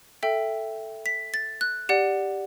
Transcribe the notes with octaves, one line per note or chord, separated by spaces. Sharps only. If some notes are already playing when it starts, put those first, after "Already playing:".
A4 E5 G5
B6
A6
F#6
G4 D5 F#5